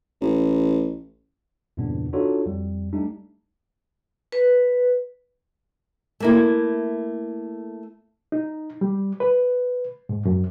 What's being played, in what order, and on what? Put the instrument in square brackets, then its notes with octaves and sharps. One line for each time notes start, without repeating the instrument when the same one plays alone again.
[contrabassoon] A1
[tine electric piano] E2 G2 A#2 C#3 B3 D4
D4 D#4 F4 F#4 A4 C#5
F2 G3
G3 A3 D4 D#4
[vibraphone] B4
[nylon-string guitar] A3 A#3 E4
[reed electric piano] D#4
G3
B4
G#2
F#2